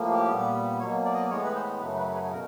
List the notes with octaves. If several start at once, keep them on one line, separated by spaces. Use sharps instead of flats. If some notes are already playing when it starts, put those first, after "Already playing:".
Already playing: A2 F3 A#3
G4
A#2 G3 B3
B2 F#3 A#3 C#5
D5
D#5
D5
A2 E3 G#3 B3 C#5
B4
C5
F#2 C#3 F#3 A3 B4
B4
G#4
B2 A#4